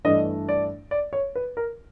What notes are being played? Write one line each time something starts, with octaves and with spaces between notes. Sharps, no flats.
G2 E3 A3 D4 D#5
D5
D5
C#5
B4
A#4